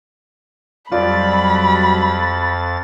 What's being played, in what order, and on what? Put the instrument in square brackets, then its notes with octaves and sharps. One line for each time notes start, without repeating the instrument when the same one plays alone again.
[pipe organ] F2 A6 [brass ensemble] F#3 G3 [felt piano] F4 D5 [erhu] B5